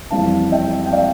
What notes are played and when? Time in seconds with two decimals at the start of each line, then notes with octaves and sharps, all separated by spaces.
0.11 F2 E3 G3 C4 E4 F5 A5
0.52 E5 G5
0.86 G5
0.92 D5 F5